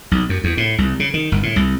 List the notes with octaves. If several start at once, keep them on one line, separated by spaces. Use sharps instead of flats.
B1
F#2
E2
A2
C2
C#3
D#3
G1
A2
C2